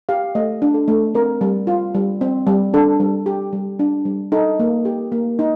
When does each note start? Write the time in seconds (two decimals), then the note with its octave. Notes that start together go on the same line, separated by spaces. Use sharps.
0.09 G4 F5
0.35 A3 D#5
0.62 D4
0.74 A4
0.88 A3
1.14 C4 A#4
1.41 G3
1.67 F4
1.94 G3
2.21 C4
2.47 G3
2.74 D4 A4
3.00 G3
3.26 G4
3.53 G3
3.79 D4
4.05 G3
4.32 D#4 A4
4.59 A#3
4.85 G4
5.12 A#3
5.39 D#4